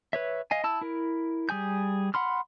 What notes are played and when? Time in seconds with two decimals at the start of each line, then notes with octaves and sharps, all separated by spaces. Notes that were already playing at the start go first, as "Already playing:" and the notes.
0.13 B4 C#5 E5
0.51 D#5 F5 G#5
0.64 E4 A5 E6
0.81 E4 A#4
1.49 G3 G#4 G#5 G6
2.14 F#5 B5 C6 F6